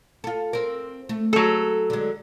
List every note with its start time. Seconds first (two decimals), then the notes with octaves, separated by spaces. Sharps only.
0.24 F4 A4
0.53 C4 A#4
1.09 A3
1.33 F#3 G#3 A4
1.90 D3 G#3